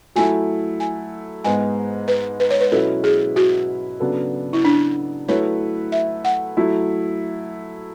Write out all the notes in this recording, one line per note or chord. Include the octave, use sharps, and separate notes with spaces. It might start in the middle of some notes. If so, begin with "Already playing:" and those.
F#3 A3 E4 G#5
G#5
G#2 G#3 B3 G#5
B4
B4
C#5
B4
B2 F#3 C#4 E4 A4 B4
G#4
F#4
C#3 F#3 B3 D4 A4
E4
D4
F#3 A3 E4 B4 C#5
E5
F#5
F#3 A3 E4